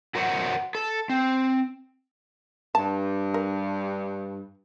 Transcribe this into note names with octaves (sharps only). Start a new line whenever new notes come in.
F#4 A#4 C5 C#5 D#5 F#5
A4
C4
G2 A5
A#4